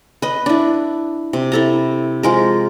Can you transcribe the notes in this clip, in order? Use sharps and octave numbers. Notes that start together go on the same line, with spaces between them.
B4 D#5
D4 E4
C3
E4 A4 A#5
F3 G#3 A#4